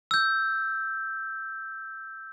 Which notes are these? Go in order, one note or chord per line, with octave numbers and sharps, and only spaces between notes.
E6 G6